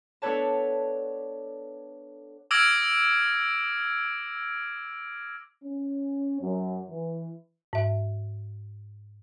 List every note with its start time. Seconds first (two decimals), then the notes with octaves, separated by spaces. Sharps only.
0.22 B3 D4 A4 B4 C#5 A5
2.51 D6 E6 F6 G#6 A#6 D7
5.64 C#4
6.41 F#2
6.90 E3
7.73 G#2 E5